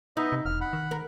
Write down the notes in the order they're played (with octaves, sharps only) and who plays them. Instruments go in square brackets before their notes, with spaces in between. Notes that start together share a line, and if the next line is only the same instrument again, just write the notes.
[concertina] B3 D#5 E5 [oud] D#4
[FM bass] C3
[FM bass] E1 [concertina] F6
[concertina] F#5 B5
[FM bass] D#3
[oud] A#4